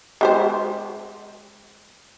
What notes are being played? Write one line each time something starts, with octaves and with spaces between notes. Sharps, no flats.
G#3 G4 C5